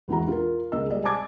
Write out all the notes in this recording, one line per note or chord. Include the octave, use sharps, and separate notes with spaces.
G#1 E2 E3 F#4 A#5
F4 A#4
C#2 A#3 G#4 D#5 E6
G3 G#3 G#4 D5 D#5
G#5 A5 D6 G#6 A6